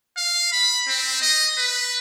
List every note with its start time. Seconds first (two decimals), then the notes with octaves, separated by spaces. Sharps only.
0.17 F5
0.53 B5
0.88 C4
1.22 D#5
1.58 B4